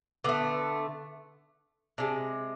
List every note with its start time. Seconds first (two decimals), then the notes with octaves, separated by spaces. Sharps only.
0.24 D3 A3 B3
1.98 C3 G#3 D4